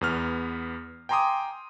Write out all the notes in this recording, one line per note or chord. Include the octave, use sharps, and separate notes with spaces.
E2 B3 F6
G5 G#5 A#5 C6 D6 D#6